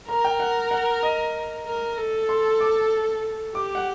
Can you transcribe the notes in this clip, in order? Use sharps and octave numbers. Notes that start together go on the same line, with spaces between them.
A#4 A#5
G5
F#5
F#5
D#5
A#4
A4
C6
D6
G4 D6
F#5